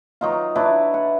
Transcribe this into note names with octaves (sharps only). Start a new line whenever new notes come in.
F#3 D#4 F4
F#3 D4 E4 B4
F#5